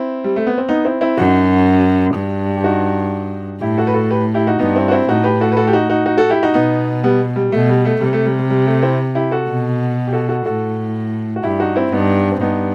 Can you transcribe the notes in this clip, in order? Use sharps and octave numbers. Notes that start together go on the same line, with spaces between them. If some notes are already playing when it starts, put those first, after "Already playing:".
Already playing: C4 E4
G3
A3
B3
C4
B3 D#4
C4 E4
C4 E4
F#2 D#4 F#4
G2
G4
D#4 F#4
A2 E4 G4
F#4 A4
B4
F#4 A4
G4 B4
E4 G4
D#4 F#4
G2 B3 D#4
C4 E4
F#4
C4 E4
A2 D#4 F#4
G4 B4
F#4 A4
B4
F#4 A4
G4
D#4 F#4
D#4 F#4
D#4 F#4
F#4 A4
E4 G4
D#4 F#4
B2 B3 D#4
G3 B3
G3
B2 A3
G3
A3
C3 G3
A3
G3
G3
G3
A3
C4 E4
E4 G4
F#4 A4
B2
G4
F#4 A4
F#4 A4
A2 F#4 A4
F#4
G2 E4 G4
D#4 F#4
C4 E4
G2 B3 D#4
C4
G2 B3 D#4